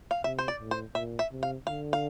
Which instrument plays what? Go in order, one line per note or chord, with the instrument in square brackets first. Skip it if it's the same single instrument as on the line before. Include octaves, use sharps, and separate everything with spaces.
[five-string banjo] F5
[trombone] C3 [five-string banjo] E5
[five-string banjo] C5
D5
[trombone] A2
[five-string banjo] C5
[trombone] A#2 [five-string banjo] E5
[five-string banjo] E5
[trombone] C3
[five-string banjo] F5
[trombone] D3 [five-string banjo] F5
[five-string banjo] F5